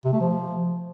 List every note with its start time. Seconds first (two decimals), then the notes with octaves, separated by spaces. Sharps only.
0.05 C3
0.13 A3
0.21 F3